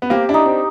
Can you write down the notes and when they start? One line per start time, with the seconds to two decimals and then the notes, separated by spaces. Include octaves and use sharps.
0.02 B3
0.10 A#3 C4 G4
0.29 D4 E4
0.34 D#4
0.46 C4 D4